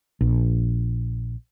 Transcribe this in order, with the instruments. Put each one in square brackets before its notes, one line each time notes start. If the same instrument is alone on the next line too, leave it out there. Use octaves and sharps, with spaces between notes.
[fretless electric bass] A#1